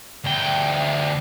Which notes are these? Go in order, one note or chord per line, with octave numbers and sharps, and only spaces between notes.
D2 G5